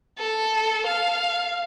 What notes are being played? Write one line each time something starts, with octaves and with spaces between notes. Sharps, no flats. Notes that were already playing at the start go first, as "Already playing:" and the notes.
A4
F5